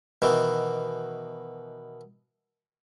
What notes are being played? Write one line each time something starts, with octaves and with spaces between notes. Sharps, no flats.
B2 D#3 E3